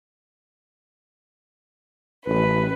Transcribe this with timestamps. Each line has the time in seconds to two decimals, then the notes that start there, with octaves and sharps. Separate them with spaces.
2.26 A1 B4